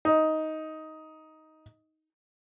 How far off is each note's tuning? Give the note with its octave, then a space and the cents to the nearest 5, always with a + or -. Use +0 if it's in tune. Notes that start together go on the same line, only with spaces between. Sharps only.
D#4 +10